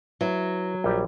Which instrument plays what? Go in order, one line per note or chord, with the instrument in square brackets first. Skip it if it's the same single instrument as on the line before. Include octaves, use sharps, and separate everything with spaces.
[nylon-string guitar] F#3 [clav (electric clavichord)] E4 B4
[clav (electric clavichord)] A#1 G3 G4